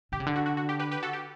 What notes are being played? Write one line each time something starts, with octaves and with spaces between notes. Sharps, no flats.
D3 G4
C#3
D3
F#4
F#4
F#4
G4
G4 B4
G4 B4
F#4 A4
G4